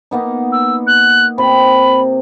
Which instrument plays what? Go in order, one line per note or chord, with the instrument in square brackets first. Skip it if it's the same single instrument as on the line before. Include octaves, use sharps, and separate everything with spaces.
[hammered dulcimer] A#3 B3 D#4
[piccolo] E6
F#6
[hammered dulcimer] C3 [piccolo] B5